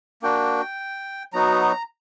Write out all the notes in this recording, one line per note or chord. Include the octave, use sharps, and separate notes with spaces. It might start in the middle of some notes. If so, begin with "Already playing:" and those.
A#3 D4 F#4 G5
F#3 B3 D#4 F#4 A#5